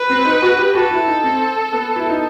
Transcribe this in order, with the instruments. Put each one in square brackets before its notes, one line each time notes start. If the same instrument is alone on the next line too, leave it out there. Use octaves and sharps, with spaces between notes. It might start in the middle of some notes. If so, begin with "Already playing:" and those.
Already playing: [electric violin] B4
[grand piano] C4
D#4
F#4
G4
[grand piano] F#4 [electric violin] A4
[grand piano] E4
D#4
C4
B3
E4
D#4